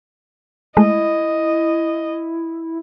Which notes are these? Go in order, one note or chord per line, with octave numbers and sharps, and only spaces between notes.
G#3 A3 E4 D#5